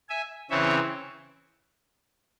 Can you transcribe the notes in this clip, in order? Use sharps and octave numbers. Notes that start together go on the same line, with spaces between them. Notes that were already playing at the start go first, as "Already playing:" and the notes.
E5 G#5
C#3 E3 C4 C#5 E5